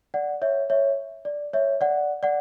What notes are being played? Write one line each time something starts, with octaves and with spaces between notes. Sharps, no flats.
D5 F#5
C#5 E5
C#5 E5
D5
C#5 E5
D5 F#5
D5 F#5